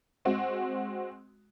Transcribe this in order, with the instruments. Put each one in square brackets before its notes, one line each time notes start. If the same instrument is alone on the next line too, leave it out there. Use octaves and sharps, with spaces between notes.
[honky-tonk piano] G#3 C4 F#4